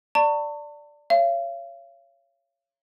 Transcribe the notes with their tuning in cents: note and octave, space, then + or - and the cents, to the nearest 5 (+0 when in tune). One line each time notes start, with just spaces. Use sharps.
D5 +0 A5 +40 C#6 +0
C#5 +0 F5 -40